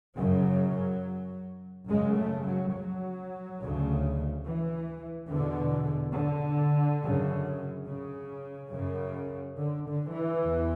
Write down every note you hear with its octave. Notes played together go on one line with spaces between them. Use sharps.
F#2 C#3 F#3
F#2 C#3 G#3
A3
F#3
F#3
D2 C#3
E3
E2 B2 D3
D3
F#2 C#3
C#3
F#2 C#3
D3
D3
E3
E2